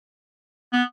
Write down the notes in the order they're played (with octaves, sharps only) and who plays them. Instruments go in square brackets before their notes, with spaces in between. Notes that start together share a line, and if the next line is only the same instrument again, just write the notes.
[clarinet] B3